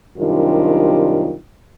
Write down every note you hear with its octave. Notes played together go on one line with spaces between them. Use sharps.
F#2 C3 D#3 G3 D4 F4